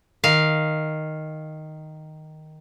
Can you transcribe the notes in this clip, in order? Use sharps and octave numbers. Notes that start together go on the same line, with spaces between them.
D#3 F5